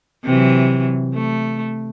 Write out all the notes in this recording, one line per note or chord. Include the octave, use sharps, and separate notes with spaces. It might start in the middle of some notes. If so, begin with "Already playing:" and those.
C3 E3 F#3
A3